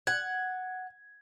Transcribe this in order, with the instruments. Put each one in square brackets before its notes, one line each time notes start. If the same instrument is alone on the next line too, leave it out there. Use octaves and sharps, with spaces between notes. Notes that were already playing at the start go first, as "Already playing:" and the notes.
[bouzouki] F#5 [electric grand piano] G#6